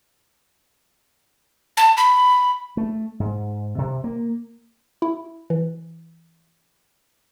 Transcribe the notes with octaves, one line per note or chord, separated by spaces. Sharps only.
A5
B5
A3
G#2
C3
A#3
E4
E3